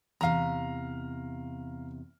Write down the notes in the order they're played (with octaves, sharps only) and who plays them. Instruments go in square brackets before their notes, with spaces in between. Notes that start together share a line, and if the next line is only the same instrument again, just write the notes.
[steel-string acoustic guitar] E2 A2 C3 [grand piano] F5 A#5